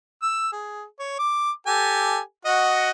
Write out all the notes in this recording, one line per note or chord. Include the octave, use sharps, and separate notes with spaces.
E6
G#4
C#5
D6
G4 A4 G#5
F#4 D#5 F#5